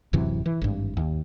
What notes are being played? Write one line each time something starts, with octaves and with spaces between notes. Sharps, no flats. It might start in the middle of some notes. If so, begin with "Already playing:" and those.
D1 F#2 C3 E3
E3
G#1 G2
D#2